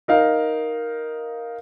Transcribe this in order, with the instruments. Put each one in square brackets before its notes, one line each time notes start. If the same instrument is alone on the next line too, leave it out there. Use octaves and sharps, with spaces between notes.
[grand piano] D#4 A#4 F5